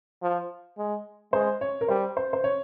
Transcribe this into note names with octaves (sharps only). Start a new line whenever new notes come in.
F3
G#3
G#3 C5
C#5
A#4
G3 C5
C5
C5
C#5